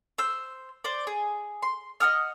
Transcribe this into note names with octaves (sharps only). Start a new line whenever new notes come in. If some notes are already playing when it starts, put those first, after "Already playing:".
C5 E6
C5 D5
G#4
C6
D#5 F#5 D#6 F6